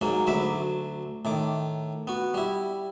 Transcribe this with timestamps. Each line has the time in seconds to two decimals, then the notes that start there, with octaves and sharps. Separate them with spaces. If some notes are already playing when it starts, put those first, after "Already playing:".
0.01 G#2 F#3 A#3
0.27 D2 F#3 E5 B5 D6
1.25 A2 D#3 D6
2.07 B3 F#4
2.34 G3 E4